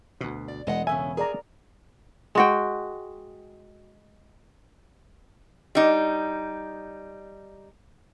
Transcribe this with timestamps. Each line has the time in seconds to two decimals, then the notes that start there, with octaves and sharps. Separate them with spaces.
0.21 D2 B2
0.48 D5
0.67 E1 G#3 D#5 F#5
0.87 C#3 B3 C#4 E5 G#5
1.17 G#4 A#4 D5 A#5
2.35 G#3 F#4 G5
5.75 G3 D#4